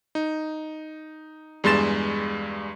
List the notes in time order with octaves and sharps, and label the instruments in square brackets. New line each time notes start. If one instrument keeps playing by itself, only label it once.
[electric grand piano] D#4
E2 G2 G#3 C6 A6 E7